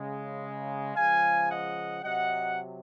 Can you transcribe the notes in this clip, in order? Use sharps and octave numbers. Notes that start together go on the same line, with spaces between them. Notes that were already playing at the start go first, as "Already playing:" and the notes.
Already playing: C#3 G#3
C#3 F3 G#3 F5 G#5
D#5 F#5
C3 F#3 D#5 F#5